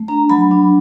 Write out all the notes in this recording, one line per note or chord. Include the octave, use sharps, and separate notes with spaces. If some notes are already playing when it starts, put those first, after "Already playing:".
Already playing: A3
D4 A#5
F#3 B5
D4